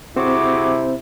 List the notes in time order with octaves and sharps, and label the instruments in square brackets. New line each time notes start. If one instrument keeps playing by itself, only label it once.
[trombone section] C3 E4 [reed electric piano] C4 C5 [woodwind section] F#4 G#4 D6